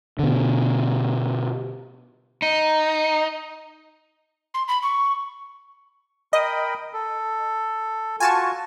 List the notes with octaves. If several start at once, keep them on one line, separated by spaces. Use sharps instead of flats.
B2 D3
D#4
C6
B5
C#6
A#4 D#5 G5 B5
A4
F4 F#4 G#5 A5 C#6